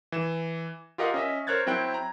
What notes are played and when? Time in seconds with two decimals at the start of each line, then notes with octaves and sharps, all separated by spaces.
0.12 E3 E7
0.98 F4 G4 A#4 D#5 F5 F#5
1.14 C#4 D#5 E5
1.47 A#4 C5 C#5 F#6 G#6 A6
1.66 F#3 C4 E4 G5 F#6
1.94 A#5